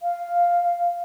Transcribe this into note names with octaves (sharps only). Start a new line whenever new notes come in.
F5